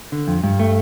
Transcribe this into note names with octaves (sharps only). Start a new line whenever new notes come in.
D3
F2
G2
A3